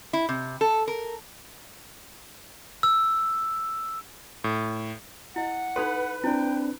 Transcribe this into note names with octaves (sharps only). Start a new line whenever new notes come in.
E4
C3
A4
A#4
E6
A2
E4 D#5 F#5
D#4 A4 B4 C6
C4 D4 E4 G5